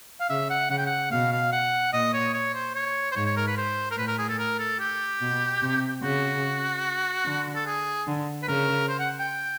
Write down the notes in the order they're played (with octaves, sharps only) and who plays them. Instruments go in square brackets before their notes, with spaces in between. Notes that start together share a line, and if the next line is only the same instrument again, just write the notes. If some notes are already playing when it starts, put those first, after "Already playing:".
[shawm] F5
[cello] C#3 [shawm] E5
[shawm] F#5
[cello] C#3 [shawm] F#5
[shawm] G5
F#5
[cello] B2 [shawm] F5
[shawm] F5
F#5
[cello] A#2 [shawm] D#5
[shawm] C#5
C#5
C5
C#5
C5
[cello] G#2 [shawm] C#5
[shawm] C#5
A#4
B4
C5
A#4
[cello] A2 [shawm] B4
[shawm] A#4
G#4
A4
A#4
A4
G4
[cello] B2
C3
[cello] C#3 [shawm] F#4
[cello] D3
[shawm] A4
G#4
[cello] D3
[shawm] B4
[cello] C#3 [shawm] A#4
[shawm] C5
F#5
G5